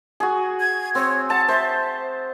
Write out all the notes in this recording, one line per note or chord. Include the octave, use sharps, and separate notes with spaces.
F#4 G#4
G#6
C4 C#5
F#5 A5
C5 E5